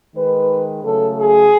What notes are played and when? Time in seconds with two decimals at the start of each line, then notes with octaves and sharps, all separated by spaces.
0.15 D#3 G#3 B4
0.83 C#3 F#3 A3 A4
1.18 G#4